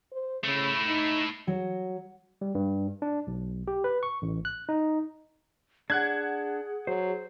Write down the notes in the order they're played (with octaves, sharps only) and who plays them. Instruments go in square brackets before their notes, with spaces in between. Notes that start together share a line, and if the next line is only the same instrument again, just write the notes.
[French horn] C5
[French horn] C#3 [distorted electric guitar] A3 E4
[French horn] D#4
[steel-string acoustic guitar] F#3
[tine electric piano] G3
G2
D4
B1
G4
B4
C#6
A1
F#6
D#4
[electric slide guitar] D4 [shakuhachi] G#4 [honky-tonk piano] F#5 F#6 G#6
[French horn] F#3 [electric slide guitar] C5